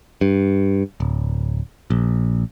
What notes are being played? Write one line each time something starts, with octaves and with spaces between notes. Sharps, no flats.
G2
D1
A#1